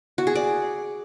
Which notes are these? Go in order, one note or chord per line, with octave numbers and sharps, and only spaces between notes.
F#4
G#4
D5